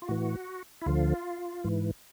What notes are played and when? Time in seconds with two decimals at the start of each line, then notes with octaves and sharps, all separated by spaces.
0.02 F4
0.08 A2 E3 F#4
0.82 E4
0.86 D2 D3 F3 F4
1.64 G#2 E3